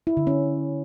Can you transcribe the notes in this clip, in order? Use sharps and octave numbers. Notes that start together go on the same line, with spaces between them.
E4
D3
C#4